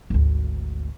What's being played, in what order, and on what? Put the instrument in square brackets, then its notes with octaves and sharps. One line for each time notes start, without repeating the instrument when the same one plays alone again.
[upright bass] G#1 D2